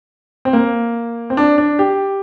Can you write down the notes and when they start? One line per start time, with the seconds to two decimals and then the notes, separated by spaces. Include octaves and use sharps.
0.45 C4
0.53 A#3
1.30 C4
1.37 D4
1.58 D4
1.79 G4